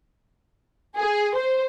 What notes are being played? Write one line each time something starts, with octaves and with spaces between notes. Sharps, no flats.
G#4
C5